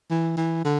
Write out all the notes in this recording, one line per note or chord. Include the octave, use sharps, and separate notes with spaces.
E3
E3
D3